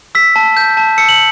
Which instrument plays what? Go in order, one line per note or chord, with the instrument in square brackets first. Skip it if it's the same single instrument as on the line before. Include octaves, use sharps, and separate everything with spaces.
[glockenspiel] E6 B6
A5
G6
A5
E6 C#7
F#7